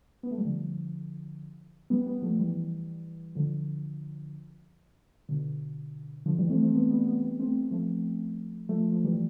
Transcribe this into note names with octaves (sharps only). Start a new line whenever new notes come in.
B3
A3
G3
D3 F3
G3 B3
G3 B3
F3 A3
E3 G3
D3 F3
B2 D3
D3 F3
E3 G3
A3 C4
A3 C4
G3 B3
G3 B3
G3 B3
G3 B3
A3 C4
F3 A3
F3 A3
F3 A3
F3 A3
E3 G3